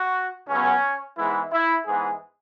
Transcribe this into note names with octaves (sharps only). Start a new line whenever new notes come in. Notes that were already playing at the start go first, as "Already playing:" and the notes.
Already playing: F#4
C#2 C#3 F#3 B3 C#4
G#2 E3 G#3 B3 E4
E4
G#2 E3 G#3 B3 G#4